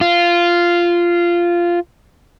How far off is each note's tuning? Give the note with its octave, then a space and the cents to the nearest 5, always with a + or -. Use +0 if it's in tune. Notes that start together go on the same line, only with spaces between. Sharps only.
F4 -10